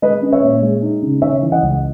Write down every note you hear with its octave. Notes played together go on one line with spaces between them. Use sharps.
G#3 B4 D#5
C#4
C#5 E5
A#2
G#3
D#4
C#3
C#3 C#5 E5
E3
D#5 F#5
C#2